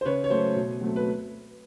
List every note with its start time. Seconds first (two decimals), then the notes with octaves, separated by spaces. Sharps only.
0.01 C5
0.05 C#3 B4 C#5
0.24 C#5
0.30 F#3 A3 C5
0.56 B2
0.81 F#3 A3 C4
0.96 B4